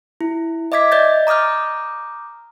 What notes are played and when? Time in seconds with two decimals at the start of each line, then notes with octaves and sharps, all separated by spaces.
0.21 E4
0.72 D#5 E5 D6 G#6 B6
0.91 D5 D#5 G6 A6
1.27 A#5 D6 D#6 F6 G6